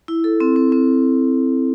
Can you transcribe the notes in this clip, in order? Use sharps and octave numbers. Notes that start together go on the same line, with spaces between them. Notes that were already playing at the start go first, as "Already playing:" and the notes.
E4
A4
C4
C4
C4